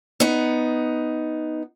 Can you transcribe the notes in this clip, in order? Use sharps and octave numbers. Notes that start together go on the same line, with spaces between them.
B3 D#4